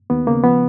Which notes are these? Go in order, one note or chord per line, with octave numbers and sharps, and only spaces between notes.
D#2 B3
C#3 A#3
F3 B3